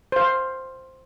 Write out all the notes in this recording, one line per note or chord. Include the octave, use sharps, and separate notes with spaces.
C5 F5